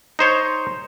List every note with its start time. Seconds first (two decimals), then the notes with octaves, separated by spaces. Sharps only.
0.19 D#4 C5 C#5